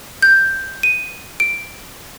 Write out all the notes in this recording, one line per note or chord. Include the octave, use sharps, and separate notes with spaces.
G6
D#7
D7